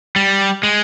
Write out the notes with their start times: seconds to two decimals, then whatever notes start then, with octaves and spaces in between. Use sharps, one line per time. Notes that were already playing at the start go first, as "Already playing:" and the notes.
0.16 G3
0.63 G#3